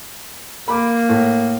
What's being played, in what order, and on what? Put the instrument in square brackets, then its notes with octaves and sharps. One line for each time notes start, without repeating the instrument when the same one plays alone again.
[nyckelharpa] A#3 [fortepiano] B5 D6
[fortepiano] A2